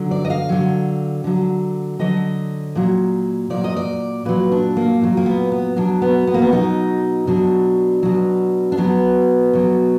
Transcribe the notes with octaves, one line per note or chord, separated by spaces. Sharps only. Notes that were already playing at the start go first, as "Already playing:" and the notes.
Already playing: D3 F#3
D5
D#5
F5
D3 F#3
D3 F#3
D3 F#3 D#5
A#2 F#3
A#2 F#3 D5
D#5
D5
A#2 F#3 B4
D4
A#3
A#2 F#3
A#3
B3
B3
B2 F#3 D4
B3
B3
A#3
B3
B2 F#3 D#4
B2 F#3 D4
B2 F#3
D4
B2 F#3 B3
B2 F#3